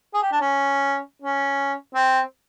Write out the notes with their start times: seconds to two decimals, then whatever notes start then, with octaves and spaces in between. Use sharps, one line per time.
0.14 G#4
0.22 G4
0.32 D4
0.41 C#4
1.22 C#4
1.94 C4